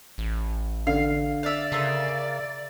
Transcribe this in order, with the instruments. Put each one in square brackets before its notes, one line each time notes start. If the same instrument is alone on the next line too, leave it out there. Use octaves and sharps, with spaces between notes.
[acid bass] A1
[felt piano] D3 [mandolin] F5
[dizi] D5 [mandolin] E5 F5
[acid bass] C#3 [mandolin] F4 A#4 E5